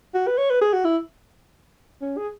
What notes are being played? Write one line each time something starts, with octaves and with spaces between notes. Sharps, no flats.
F#4
B4
C#5
B4
G#4
F#4
E4
C#4
G#4